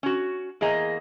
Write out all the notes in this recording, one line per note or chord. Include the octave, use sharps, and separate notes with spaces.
C#4 F#4
E2 A#3 G#4 D#5 A#5